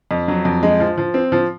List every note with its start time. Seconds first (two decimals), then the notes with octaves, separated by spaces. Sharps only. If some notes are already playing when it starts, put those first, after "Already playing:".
0.11 F2
0.28 F#3
0.45 F2
0.63 G#3
0.80 F3
0.98 F3
1.14 C4
1.32 F3